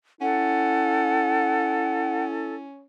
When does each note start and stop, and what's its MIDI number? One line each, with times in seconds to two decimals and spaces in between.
0.21 2.85 61
0.21 2.67 64
0.21 2.55 69
0.21 2.24 78